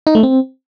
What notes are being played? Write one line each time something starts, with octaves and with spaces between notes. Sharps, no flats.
D#4
A3
C4